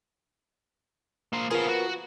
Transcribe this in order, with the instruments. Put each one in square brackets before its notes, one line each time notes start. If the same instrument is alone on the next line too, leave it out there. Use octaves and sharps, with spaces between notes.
[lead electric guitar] A#3 C5
[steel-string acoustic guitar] F3 B3 A#4 [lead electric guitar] G#4 F5
[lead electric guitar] F#4